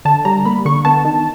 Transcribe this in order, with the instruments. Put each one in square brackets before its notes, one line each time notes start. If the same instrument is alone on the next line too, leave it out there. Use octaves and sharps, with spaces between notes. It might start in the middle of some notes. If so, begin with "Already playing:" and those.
[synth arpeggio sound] D3 A5
G3 A#5
A#3 B5
D3 C#6
B3 A5
D#3